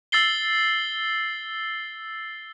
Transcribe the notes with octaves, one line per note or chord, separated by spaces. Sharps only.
E6 A6 C7 G7